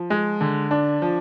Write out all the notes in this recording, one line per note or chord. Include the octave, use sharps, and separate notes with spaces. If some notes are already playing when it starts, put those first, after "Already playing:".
Already playing: F3
G#3
D3
D4
F3